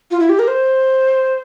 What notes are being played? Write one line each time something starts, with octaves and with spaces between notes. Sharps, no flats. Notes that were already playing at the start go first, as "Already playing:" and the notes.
F4
E4
G4
A#4
C5